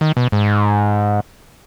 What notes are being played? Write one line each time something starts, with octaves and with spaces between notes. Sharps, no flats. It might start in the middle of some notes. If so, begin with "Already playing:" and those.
D#3
B2
G#2